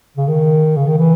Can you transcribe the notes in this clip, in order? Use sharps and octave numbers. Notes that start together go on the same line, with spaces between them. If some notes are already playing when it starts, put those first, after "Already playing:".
C#3
D#3
C#3
D#3
E3